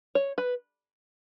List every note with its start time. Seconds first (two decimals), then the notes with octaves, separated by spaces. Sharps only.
0.15 C#5
0.38 B4